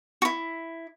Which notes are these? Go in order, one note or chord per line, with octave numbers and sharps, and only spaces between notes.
E4 F#4